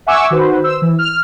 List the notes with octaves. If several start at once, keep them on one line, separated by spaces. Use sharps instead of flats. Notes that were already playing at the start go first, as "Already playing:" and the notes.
E5 F#5 G#5 C#6 D6 E6
D#3 F#4 B4 C5
C5 E6
E3
F6